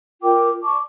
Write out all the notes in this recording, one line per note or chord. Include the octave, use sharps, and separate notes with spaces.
F4 A#4 G5 D6
D5 A5 C#6 D6